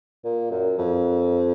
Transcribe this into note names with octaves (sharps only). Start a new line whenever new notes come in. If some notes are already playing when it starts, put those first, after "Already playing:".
A#2
F#2
F2